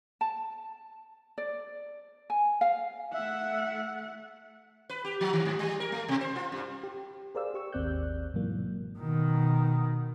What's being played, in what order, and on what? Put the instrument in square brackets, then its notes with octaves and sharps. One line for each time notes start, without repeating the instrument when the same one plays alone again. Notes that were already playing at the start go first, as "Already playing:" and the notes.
[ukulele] A5
D5
G#5
F5
[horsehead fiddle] A3 F#5 [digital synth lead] E5
[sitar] B4
G4
F3
D#3
G#2
G3
A#4
A3
B2
C5
F4
G2
[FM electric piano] G4
G#4 A#4 C5 D5 F5 E6
G4 C#6 E6
G#1 D#2 C4 D5 F#6 G6
G#2 B2 E3 F#3 A#3
[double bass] B2 D#3